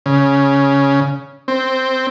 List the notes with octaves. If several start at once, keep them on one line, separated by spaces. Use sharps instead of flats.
C#3
C4